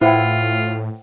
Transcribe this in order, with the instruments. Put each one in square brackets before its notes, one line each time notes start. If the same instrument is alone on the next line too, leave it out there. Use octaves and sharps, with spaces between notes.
[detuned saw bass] A2 [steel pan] E4 [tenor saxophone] F4 [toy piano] C5 F#5 G5